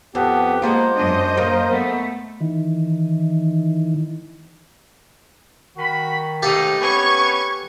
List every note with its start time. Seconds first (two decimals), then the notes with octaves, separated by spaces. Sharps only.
0.15 F2 B3 G4
0.62 G#3 A#3 B3 F4 C5
0.97 F#2 D4 D#5
1.37 A#3 A#4
1.71 A3 B3
2.40 D#3 E3
5.77 D#3 F#4 B5
6.42 G#2 A3 D#4 G4 A4 F5
6.81 B3 C#4 B4 C#6 G#6